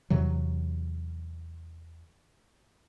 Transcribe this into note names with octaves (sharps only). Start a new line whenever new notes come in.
E2 C3 E3 F#3